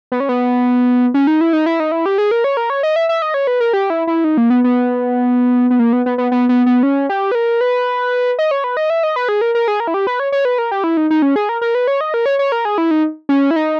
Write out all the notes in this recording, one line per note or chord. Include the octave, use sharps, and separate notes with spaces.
B3
C#4
B3
C#4
D#4
E4
D#4
E4
D#4
E4
G4
G#4
A#4
C#5
A#4
C#5
D#5
E5
E5
D#5
C#5
B4
A#4
G4
E4
E4
D#4
A#3
B3
B3
B3
A#3
B3
B3
B3
B3
B3
B3
C#4
G4
B4
A#4
B4
D#5
C#5
B4
D#5
E5
D#5
B4
G#4
A#4
A#4
G#4
A#4
E4
G4
B4
C#5
C#5
B4
A#4
G4
E4
D#4
D#4
C#4
G#4
A#4
A#4
B4
C#5
D#5
A#4
C#5
C#5
A#4
G#4
E4
D#4
C#4
E4
D#4